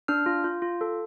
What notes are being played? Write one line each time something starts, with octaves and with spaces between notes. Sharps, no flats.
D4 F6
F4
F4
F4
A4